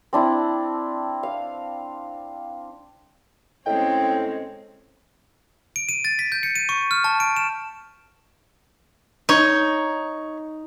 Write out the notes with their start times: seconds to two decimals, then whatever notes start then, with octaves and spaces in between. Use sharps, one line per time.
0.13 C4 D4 E4
1.23 F5
3.66 A2 G#3 C4 C#4 D#5 G5
5.76 D7
5.89 D#7
6.05 A6
6.19 B6
6.32 G6
6.43 C#7
6.56 D#7
6.69 C#6
6.91 F6
7.04 A5
7.20 D7
7.36 E7
9.29 D#4 C#5